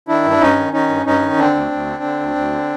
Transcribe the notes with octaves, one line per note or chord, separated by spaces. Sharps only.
D#3 D4 E4
G2
D4
G2 C#4 D#4
D#3
D#3 C#4 D#4
G2
G2 C#4 D#4
D#3
D3 C4 D4
D2
D2
D3
D3
D2
D2
D3